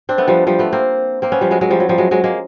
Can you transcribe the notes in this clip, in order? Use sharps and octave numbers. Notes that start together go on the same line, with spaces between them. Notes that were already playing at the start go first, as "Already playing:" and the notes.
C4 D4
A3 B3
F3 G3
F3 G3
A3 B3
A#3 C4
A#3 C4
B3 C#4
F3 G3
F#3 G#3
F#3 G#3
F3 G3
F#3
F3 G3
F#3 G#3
F#3 G#3
G#3 A#3